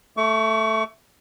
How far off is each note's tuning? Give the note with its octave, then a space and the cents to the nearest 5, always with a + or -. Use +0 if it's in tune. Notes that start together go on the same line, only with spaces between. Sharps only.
A3 +0 C#6 +35